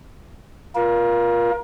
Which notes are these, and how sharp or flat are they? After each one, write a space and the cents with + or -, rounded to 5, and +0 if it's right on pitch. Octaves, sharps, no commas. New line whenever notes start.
F4 +0 A#4 +30